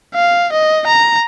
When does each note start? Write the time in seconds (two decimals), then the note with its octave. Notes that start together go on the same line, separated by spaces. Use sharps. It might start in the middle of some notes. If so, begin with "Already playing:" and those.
0.15 F5
0.53 D#5
0.87 A#5